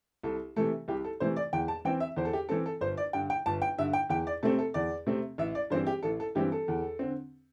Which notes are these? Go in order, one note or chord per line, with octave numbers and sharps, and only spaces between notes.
C2 A4
C3 E3 A3 A4
C2 G4
A4
C3 E3 A3 C5
D5
E2 G5
A5
E3 C4 G5
E5
E2 C5
A4
G4
E3 C4 A4
A4
G1 C5
D5
G2 D3 G5
G5
G1 A5
G5
G2 D3 E5
G5
E2 G5
D5
C3 A3 C4 A4
A4
E2 D5
C3 A3 C4
A1 E5
D5
G2 E3 G3 C4 C5
G4
A1 A4
A4
G2 E3 G3 C4 G4
A4
E2
D3 C4